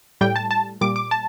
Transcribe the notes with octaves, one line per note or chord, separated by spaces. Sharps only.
A2 G3 G5
A5
A5
A#2 G3 D6
D6
A5